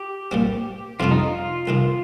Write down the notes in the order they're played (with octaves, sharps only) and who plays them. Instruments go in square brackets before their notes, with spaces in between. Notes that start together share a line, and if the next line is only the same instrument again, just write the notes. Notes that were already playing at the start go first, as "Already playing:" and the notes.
Already playing: [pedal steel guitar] G4
[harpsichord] A#2 G3 C4
[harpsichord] F2 C3 G3 D4 [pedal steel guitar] F4
[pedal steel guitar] D#4
F4
[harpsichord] C2 C3 D#3